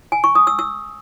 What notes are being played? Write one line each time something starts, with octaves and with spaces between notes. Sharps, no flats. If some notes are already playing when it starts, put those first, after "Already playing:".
G#5
C#6
D#6
E6
E6